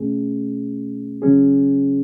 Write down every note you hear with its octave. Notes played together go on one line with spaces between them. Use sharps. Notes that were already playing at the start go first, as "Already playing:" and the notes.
Already playing: B2 A3 C#4 G#4
C#3 F#3 C#4 G#4